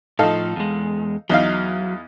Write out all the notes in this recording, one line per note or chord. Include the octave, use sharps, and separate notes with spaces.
A2 F3 D#4 A4 F5
E2 G#3
E2 F#3 D#4 F5